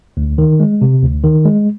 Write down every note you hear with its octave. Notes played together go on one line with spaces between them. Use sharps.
D2
D#3
G#3
C3
D2
D#3
G#3